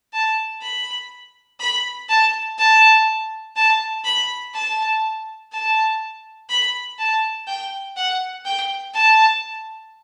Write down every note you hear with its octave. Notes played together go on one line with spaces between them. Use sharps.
A5
B5
B5
A5
A5
A5
B5
A5
A5
B5
A5
G5
F#5
G5
A5